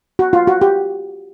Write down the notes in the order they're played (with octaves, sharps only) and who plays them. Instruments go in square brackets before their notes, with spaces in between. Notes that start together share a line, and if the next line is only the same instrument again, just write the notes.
[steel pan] F#4
F4
F#4
G4